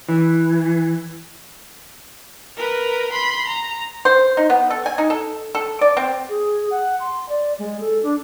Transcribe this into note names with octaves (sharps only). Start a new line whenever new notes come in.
E3
A#4 B4
B5 C6
A#5
C5
D#4
B3
A4
G#5
D#4
A4
A4
D5
C4
G#4
F#5
C6
D5
G#3
A4
D4